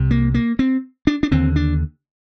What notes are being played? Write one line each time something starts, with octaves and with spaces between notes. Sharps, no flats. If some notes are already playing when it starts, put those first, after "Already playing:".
Already playing: C2 C3
A#3
A#3
C4
D4
D4
D#2 D3 C4
D4